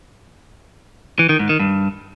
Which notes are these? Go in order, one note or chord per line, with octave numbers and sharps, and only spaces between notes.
E3
D#3
G#2
D#3
G2